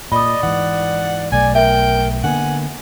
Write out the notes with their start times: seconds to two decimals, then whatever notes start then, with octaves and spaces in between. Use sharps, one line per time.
0.12 A#2 D5 D#5 B5 D#6
0.43 G#2 E3 F#5
1.32 B1 A3 D5 G#5
1.55 A#4 E5 G5
2.24 D3 A#3 B3 F#5 G#5